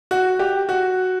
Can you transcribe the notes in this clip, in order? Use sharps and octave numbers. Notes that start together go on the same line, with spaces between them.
F#4
G4
F#4